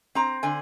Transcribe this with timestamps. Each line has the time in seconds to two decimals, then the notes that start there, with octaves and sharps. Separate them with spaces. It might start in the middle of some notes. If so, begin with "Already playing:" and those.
0.15 C4 A#5
0.43 D3 G#5